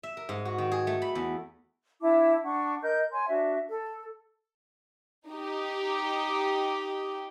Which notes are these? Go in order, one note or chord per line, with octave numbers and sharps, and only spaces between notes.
E5
A#4
G#2
F#4
D#3
G#4
A3
B5
E2
D4 E4 A5 D6
D4 F#5 C#6
A#4 D#5 G6
C#5 G#5 C6
D4 F#4 E5
A4
D#4 G4